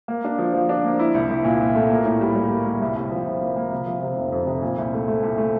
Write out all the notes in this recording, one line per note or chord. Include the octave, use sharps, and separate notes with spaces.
A#3
D4
F3
F3
D4
A#3
E4
C2
C2
A#2
C2
A3
A#3
A2
G3
G3
A#3
G3
C2
C2
F3
C2
A#3
A#3
C3
F3
C3
F1
F2
C3
A#2
C2
A3
A3
C2
A3